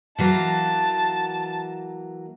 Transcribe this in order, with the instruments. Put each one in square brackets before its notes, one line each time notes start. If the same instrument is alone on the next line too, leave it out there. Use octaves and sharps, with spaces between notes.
[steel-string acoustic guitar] E3 F#3 A#3 [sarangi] A5